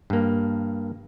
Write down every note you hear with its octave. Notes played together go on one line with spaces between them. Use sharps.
G2 A#3